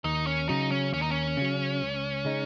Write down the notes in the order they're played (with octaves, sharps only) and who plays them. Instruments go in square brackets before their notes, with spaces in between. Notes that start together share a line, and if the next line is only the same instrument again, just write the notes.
[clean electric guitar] D#2 [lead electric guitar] D#4
[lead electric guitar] C#4
[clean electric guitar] C#3 F#3 [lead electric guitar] D#4
[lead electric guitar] C#4
[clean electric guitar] D#2 [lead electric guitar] C#4
[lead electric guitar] D#4
C#4
[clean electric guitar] C#3 F#3
C#2
C#3 G#3 D#4